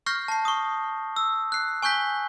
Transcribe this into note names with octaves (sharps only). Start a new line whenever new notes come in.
C#6 F6 G6 A#6 C7
A5 C7
C#6 D#6
E6
F#6 C7
G#5 C#6 F#6 G6 B6 G7